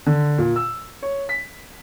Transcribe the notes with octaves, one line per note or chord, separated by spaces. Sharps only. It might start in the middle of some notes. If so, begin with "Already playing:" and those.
D3
A#2
E6
C#5
B6